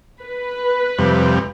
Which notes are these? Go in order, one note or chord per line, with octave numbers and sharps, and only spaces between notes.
B4
F2 C3 G3